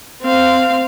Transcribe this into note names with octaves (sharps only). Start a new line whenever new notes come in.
C4 F5